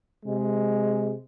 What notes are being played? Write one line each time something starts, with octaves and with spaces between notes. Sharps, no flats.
C3 G#3